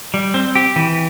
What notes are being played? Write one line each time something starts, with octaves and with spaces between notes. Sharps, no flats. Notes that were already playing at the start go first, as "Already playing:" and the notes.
G3
C4
G4
E3